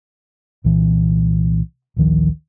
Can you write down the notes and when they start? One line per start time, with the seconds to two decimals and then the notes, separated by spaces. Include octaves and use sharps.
0.64 C2 A#2 E3
1.97 A1 D2 D#3 F3